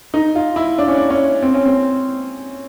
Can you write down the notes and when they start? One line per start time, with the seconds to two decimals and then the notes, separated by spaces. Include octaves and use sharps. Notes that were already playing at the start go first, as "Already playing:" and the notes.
0.14 D#4
0.35 F4
0.56 E4
0.78 D4
0.88 C#4
0.98 D4
1.10 C#4
1.43 C4
1.54 C#4
1.65 C4